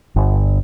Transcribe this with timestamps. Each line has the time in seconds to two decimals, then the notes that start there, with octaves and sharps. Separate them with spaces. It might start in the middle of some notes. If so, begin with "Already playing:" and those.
0.16 G1